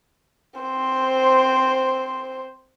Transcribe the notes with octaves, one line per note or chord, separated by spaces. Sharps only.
C4 C5